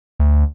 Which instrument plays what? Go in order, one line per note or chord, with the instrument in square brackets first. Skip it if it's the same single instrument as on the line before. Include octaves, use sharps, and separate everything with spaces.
[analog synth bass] D2